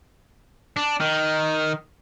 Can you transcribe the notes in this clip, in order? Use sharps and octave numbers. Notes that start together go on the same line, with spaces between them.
D4
D#3